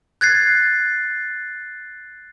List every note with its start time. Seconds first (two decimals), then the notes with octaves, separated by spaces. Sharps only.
0.21 F#6 G#6 A6 C7